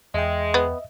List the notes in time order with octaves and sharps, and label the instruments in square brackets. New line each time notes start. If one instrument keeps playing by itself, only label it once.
[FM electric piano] E2 G5 [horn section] G#3 [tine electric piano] D#5 E5
[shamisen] B3